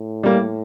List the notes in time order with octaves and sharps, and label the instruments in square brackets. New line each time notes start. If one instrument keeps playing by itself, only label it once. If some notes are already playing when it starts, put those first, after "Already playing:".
Already playing: [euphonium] A2
[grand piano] G3 A#3